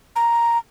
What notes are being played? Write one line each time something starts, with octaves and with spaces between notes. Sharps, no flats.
A#5